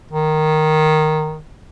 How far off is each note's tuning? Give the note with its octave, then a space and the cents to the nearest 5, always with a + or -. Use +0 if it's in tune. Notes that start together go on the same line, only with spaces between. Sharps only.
D#3 -5